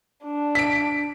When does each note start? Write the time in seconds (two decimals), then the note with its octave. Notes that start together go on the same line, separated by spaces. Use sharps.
0.24 D4
0.55 B6 D7